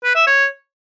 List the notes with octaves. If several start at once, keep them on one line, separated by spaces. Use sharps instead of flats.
B4
E5
C#5